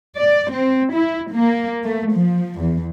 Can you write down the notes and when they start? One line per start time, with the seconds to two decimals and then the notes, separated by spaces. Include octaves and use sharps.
0.16 D5
0.50 C4
0.93 E4
1.32 A#3
1.84 A3
2.13 F3
2.60 E2